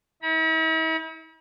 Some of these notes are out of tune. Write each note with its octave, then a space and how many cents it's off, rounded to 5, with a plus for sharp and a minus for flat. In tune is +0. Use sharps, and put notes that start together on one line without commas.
E4 -45 B5 -45